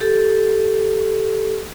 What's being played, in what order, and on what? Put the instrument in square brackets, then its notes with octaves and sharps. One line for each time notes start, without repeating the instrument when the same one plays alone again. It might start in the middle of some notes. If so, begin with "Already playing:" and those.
[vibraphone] G4 A4